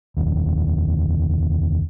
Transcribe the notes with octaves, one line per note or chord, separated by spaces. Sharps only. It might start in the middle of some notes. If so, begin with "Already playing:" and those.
F1 D#2